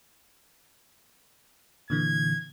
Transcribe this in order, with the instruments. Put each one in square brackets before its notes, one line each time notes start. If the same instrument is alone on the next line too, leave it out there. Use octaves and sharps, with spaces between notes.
[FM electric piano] A#2 D3 E3 [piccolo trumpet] G#6